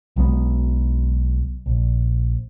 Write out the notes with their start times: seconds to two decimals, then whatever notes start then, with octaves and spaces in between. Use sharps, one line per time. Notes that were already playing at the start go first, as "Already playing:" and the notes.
0.16 B1 F#3 G#3 B3
1.66 A#1